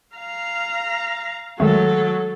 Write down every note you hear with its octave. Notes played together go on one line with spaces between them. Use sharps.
F5 A#5
D#3 F#3 G#3 A3 A4